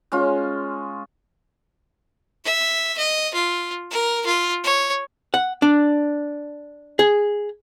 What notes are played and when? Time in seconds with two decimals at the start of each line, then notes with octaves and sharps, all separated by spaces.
0.12 G#3 C#4 F4
2.44 E5
2.98 D#5
3.34 F4
3.91 A#4
4.26 F4
4.64 C#5
5.34 F#5
5.62 D4
6.99 G#4